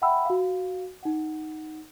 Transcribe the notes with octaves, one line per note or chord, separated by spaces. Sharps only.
E5 F#5 G5 B5 E6
F#4 F5
D#4 F#5